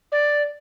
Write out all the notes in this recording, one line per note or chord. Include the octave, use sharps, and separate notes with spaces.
D5